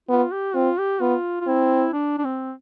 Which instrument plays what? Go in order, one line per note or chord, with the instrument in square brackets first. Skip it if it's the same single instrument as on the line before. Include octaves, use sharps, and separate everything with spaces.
[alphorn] B3 [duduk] F4
[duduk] G4
[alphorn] C4 [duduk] F4
[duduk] G4
[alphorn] B3 [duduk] F4
[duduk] F4
[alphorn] C4 [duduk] E4
[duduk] D4
D4
C4